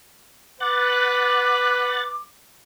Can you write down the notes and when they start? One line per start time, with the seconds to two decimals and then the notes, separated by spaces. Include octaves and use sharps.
0.60 B4 F#5 D6 F#6 A6